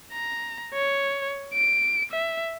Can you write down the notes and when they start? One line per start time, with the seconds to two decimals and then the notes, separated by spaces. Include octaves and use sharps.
0.12 A#5
0.74 C#5
1.54 D7
2.12 E5